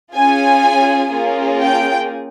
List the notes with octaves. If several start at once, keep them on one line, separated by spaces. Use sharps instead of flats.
C#4 F4 G#4 G#5
A#3 C#4 F4 G#4
G5